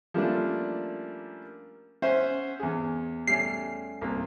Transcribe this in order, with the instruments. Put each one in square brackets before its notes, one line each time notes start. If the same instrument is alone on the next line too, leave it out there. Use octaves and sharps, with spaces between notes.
[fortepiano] F3 G3 A3 A#3 C#4 D4
C#4 C5 E5 F#5
E2 G#4
[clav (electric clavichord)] G3 A3 C#4 [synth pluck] C7
[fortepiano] C2 A#3